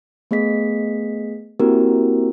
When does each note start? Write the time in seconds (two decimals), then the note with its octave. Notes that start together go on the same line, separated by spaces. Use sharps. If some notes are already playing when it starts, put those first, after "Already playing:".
0.31 A3 B3 G#4 D#5 B6
1.60 A#3 C4 E4 F#4 G4 A#4